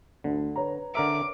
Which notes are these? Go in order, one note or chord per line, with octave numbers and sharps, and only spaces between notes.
D2 D3
B4 C#5 A#5
D3 A#4 E5 D6